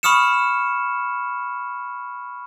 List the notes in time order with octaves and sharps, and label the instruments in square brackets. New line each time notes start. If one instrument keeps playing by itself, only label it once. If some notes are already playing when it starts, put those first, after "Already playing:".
[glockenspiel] B5 C#6 D#6 F6 C#7 E7